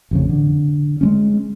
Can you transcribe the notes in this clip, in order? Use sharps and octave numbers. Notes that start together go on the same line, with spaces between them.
A1 F2 C#3
D3
G#3 A3 C#4